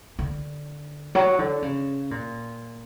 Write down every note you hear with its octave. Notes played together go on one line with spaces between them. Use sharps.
D3
F#3
D3
C#3
A#2